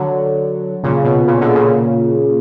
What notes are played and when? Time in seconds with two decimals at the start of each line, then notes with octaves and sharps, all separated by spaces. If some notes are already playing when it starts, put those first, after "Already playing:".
Already playing: D3 F#3
0.84 A#2 C#3
0.94 A#2
1.04 B2
1.28 A#2 C#3
1.41 B2 D3
1.55 A#2 C#3